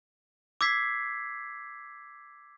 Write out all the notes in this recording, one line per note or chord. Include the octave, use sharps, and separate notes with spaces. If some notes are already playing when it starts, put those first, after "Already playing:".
D6 E6 G#6 B6 C7